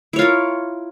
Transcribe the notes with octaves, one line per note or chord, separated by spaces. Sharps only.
E4 F4 A#4 C#5